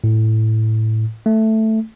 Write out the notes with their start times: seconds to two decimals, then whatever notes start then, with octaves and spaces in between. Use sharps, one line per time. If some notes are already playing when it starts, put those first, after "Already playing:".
0.04 A2
1.26 A3